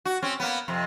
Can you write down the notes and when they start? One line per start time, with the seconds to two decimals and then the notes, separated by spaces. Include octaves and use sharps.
0.05 F#4
0.23 C4 C#4
0.40 A#3 B3
0.68 F2 C3